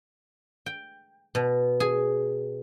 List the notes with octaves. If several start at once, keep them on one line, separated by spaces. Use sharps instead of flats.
G5
B2
G#4